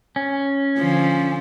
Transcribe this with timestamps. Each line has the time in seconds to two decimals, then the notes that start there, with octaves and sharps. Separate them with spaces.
0.16 C#4
0.78 D3 F3